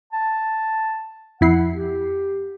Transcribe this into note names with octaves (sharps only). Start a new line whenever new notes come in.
A5
F2 E4 F#5 C7
G4